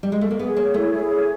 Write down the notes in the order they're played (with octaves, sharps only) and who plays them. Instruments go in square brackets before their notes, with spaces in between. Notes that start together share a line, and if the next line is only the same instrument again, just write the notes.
[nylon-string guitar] G3
G#3
A3
A#3
[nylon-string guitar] B3 [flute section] G#4
[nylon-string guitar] A#3 [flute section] C#5
[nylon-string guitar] A3 [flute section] E4
[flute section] G#4
C#5